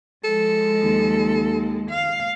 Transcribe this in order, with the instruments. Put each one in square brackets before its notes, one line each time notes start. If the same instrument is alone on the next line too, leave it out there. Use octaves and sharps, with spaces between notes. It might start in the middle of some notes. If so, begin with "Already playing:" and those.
[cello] F3 G#3 [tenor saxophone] A4
[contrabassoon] D#2
[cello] F5